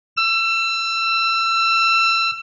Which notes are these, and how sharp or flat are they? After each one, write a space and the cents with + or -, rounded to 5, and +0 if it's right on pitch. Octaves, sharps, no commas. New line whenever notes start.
E6 +30